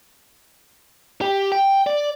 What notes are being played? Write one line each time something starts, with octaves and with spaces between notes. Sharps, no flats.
G4
G5
D5